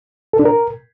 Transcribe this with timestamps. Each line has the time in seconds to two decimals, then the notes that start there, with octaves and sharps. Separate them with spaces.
0.33 A4
0.39 D4
0.45 A#4